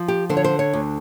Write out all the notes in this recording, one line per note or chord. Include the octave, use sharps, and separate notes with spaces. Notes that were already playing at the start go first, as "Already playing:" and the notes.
Already playing: F3
G4
D3 C5
C#5
C5
C#5
D2